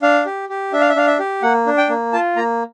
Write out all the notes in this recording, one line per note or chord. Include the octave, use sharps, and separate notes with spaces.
D4 F5
G4
G4
D4 E5
F5
E5
D4 F5
E5
G4
A#3 F#5
D4
G5
A#3
F4 A5
A#3 A#5